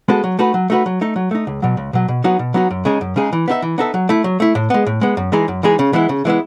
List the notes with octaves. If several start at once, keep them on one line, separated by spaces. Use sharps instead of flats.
G#3 B3 F#4 A4
F#3
A3 D#4 F#4 B4
F#3
A3 D#4 F#4 B4
F#3
A3 D#4
F#3
A3 D#4
C#2
B2 F#3
C#2
B2 F#3
B2
F#3 B3 D#4 F#4
B2
F#3 B3 D#4 F#4
F#2
C#3 G#3 D#4 G#4
F#2
C#3 G#3 D#4 G#4
E3
B3 D#4 A4 E5
E3
B3 D#4 A4 E5
F#3
A3 E4
F#3
A3 E4
A2
G#3 B3
A2
G#3 B3
F#2
E3 G#3 D#4 G#4
F#2
E3 G#3 D#4 G#4
C#3
E3 G#3 B3 E4
C#3
E3 G#3 B3 E4